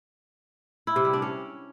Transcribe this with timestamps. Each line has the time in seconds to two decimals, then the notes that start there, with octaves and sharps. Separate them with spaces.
0.87 E4
0.96 C3
1.05 G3
1.13 D4
1.22 C#4